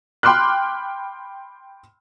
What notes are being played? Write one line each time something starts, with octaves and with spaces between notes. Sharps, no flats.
G5 B5 C6 D6 F6 F#6